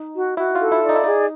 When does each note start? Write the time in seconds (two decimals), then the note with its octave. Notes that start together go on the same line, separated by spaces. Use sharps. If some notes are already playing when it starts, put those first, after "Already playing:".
Already playing: D#4
0.15 F#4
0.37 E4 F#4
0.55 F4
0.60 A4
0.72 E4
0.83 D5
0.89 D#4
0.96 E4
1.04 D#4 G#4